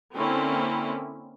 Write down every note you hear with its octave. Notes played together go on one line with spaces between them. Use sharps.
D3 A#3 C4 C#4 E4